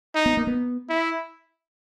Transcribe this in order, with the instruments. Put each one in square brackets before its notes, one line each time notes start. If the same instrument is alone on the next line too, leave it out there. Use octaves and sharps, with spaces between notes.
[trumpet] D#4
[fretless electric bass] B3
A#3
B3
[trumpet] E4